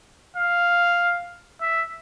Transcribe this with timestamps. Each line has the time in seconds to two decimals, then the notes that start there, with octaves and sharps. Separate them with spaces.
0.37 F5
1.62 E5